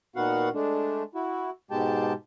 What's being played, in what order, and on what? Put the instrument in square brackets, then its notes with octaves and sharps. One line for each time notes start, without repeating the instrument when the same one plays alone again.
[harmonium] A#2 D#3 B3 F#4 F5 F#5
G#3 A3 D4
E4 F#4
G#2 B2 G#3 G4 G5 A5